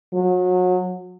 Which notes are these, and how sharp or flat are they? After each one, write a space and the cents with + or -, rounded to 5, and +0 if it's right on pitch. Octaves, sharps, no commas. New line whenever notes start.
F#3 -30